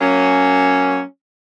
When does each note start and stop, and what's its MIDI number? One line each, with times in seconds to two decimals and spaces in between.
0.01 1.00 54
0.01 1.00 58
0.01 1.00 61